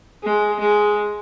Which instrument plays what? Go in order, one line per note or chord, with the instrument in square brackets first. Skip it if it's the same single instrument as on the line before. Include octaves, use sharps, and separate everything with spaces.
[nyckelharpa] G#3
G#3